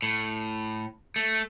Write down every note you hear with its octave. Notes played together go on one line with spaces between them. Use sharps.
A2
A3